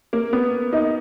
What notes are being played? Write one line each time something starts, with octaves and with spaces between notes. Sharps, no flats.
A#3
B3
D#4